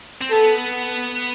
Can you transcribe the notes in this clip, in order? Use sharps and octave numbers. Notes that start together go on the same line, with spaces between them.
C4
B3 A4